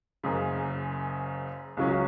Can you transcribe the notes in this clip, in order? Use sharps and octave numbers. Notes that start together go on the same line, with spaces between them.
F#1 F#2 C#3
C#2 C#3 F#3 C#4